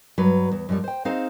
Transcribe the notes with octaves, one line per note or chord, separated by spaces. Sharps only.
G2 F#3 B4
E2
F#2 F3 G3
C5 G5
C4 D#4 G#4 C5 F5